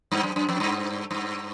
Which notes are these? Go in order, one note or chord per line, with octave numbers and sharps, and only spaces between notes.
G2
F#2
F#2
F2
G2
G2